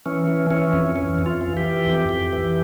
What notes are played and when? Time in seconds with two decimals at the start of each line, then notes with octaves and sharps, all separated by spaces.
0.06 E3 C#4
0.27 E3
0.51 E3 C#4
0.73 F2
0.96 E3 C#4
1.19 F2
1.26 F4
1.41 E3
1.57 G4
1.64 E3
1.87 F2
2.09 F2
2.33 E3